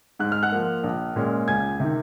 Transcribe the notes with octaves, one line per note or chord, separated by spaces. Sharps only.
G#2 F#6
F6
F#5 F#6
F3 A#3
A#1
A#2 G#3 C#4
C#2 G#5 G#6
C3 D#3